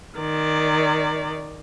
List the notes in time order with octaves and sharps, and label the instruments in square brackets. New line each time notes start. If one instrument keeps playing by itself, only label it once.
[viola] D#3 D5